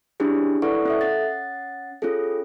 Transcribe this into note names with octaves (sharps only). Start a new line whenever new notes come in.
C#4 D4 E4 G4 G#4
E4 A4 B4 D5 F#5 C#6
C#4 A4 E5
C#4 F#5 A6
C#4 F4 G#4 A4